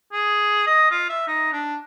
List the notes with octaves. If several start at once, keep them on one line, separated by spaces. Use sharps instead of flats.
G#4
D#5
F4
E5
D#4
D4